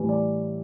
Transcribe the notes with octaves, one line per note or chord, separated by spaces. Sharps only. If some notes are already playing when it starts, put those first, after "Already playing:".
Already playing: A2 E3 G3
D5